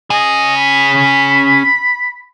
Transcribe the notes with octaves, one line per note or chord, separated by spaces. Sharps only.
C#4 G#4 D#5
B5